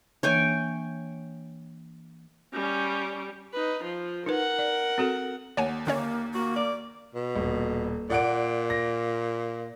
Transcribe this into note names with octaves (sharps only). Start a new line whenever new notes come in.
E3 A#3 D4 C#5 G5 G#5
G3 C#4
D#4 B4
F3 F4
D#4 A#4 B4 F#5
D5
C4 F#4 A4
D#2 C#5 F#5 G#5
D3 A#3 C#4 C#5
A#3 F#4
D5 D6
B2
D#1
A#2 D5 F#5 D7
A#6